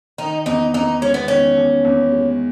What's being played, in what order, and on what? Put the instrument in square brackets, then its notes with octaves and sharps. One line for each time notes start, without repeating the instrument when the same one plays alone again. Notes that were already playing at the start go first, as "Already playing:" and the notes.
[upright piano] D#3 [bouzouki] D#4
[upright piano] E2 [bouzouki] D#4
[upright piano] E2 [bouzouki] D#4
[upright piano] G#3 [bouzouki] C#4
[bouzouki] B3
[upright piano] D#3 [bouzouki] C#4
[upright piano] E2
E2
G#3